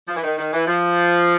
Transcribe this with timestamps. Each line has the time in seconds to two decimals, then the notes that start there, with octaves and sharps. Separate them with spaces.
0.08 F3
0.16 E3
0.23 D#3
0.38 D#3
0.53 E3
0.67 F3